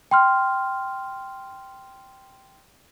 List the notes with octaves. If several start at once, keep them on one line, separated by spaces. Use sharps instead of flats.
G5 C6 F6